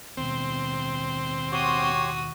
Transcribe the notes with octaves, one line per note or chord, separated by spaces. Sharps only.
D#2 B2 C4
F#4 G4 C#5 C6 D#6